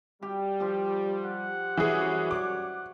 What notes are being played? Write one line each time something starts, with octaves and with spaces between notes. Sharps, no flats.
G3 G4
F3 G4
F#5
F#2 E3 G3 F#4 G#4 C#5
D6